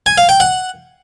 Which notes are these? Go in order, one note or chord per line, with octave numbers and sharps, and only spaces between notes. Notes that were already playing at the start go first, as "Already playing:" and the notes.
G#5
F5
G5
F#5